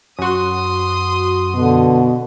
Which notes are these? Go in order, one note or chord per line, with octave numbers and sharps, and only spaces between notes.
F#2 F#4 C6 D#6
B2 D3